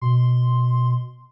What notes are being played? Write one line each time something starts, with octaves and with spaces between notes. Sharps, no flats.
B2 C6